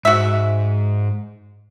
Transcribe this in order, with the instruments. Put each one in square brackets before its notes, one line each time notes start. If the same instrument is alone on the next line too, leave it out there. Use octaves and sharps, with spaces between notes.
[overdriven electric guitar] G#2 [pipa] F#4 E5